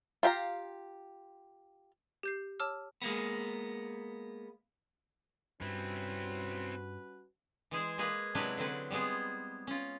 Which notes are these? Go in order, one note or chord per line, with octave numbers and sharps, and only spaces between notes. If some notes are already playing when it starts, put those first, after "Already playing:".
F4 G4 F5 A#5
G4 G6 C7
C#5 A5 D6 E6 F6
G#3 A#3 B3
G2 G3 C4 C#4 E4 F#4 B4
E3 G#3 G#4 C5
G#3 A#3 G#4 B4
C3 F#3 G#3 D4 E4 B4
D3 F#3 C4 B4
G3 G#3 B3 C4 G#4
C#4 F4